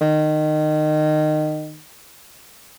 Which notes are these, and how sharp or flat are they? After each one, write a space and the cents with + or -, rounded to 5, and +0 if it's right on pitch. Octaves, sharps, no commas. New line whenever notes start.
D#3 -20